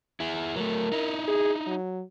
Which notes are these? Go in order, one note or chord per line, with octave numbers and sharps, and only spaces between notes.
E4 G#4
F#3 A3 A#4
D#4 E4
G#4
F#3